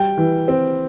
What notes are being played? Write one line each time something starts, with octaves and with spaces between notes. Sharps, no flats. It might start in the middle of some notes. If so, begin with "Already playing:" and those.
Already playing: G3 G5
E3
C4